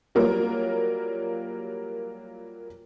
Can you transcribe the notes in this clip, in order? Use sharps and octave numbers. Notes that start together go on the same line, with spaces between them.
F#3 G3 A#3 F4 A#4